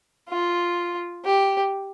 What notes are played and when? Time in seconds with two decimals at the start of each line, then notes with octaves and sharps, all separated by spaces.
0.29 F4
1.25 G4